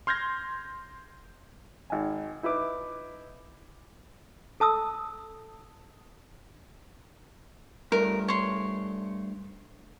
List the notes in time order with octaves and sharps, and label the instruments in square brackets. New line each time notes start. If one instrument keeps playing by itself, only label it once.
[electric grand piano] C6 F6 G6 G#6 A#6
[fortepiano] G#1 G#5
D#4 E4 B4 D6
[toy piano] A4 A5 D#6 E6
[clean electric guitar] G2 A3 [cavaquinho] A#4
[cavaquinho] C#5 C6